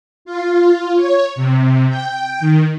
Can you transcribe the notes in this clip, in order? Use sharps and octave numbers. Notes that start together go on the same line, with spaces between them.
F4
C#5
C3
G5
D#3